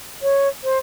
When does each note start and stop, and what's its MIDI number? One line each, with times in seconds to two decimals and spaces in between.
0.21 0.47 73
0.63 0.77 72